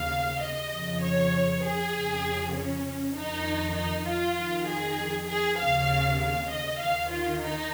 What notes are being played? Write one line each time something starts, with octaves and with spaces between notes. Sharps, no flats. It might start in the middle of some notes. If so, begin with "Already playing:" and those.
Already playing: D#2 C#3 F5
D#5
F2 C#3
C#5
G#4
F2 C#3
C#4
F2 D#3 D#4
D#4
F4
F2 D#3
G#4
G#4
D#2 C#3 F5
F5
D#5
D#2 D#3 F5
F4
D#4